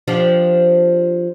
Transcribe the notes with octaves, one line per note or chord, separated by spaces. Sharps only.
F3 D4 G4